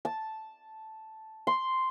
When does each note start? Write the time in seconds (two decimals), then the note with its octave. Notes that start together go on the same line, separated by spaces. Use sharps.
0.05 A5
1.47 C6